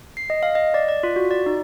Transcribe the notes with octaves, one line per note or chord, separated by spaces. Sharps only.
C7
D#5
F5
D#5
D5
D5
F4
F#4
D5
D#4